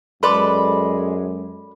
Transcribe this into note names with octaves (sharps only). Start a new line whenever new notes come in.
F#2 G#3 A4 B4 D5 B5 C6